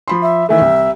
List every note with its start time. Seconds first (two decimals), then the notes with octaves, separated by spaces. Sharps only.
0.08 F3 B5 C6
0.22 E5
0.49 D#3 E3 A3 E5
0.61 C2